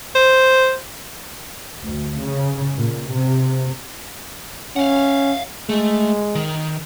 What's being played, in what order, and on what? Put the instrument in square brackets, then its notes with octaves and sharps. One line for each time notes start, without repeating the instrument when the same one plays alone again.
[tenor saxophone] C5
[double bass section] D2
C#3
A#2
C3
[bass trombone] C#4 [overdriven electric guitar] F5 F#5
[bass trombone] G#3 [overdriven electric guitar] A3
[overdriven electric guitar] D#3